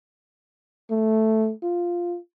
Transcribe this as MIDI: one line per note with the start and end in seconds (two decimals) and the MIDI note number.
0.90 1.52 57
1.63 2.18 65